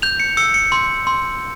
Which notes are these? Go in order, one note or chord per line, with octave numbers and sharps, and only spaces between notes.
G6 F7
C#7
E6 C#7
C#7
C6
C6